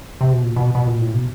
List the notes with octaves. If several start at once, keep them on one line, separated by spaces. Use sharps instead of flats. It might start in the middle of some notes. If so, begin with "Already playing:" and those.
C3
B2
A#2
B2
B2
A#2
A2
B2